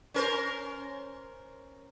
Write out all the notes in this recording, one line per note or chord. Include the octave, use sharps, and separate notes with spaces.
C#4 A#4 C5